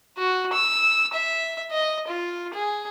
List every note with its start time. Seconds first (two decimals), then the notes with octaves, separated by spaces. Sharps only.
0.18 F#4
0.53 E6
1.13 E5
1.71 D#5
2.07 F4
2.53 G#4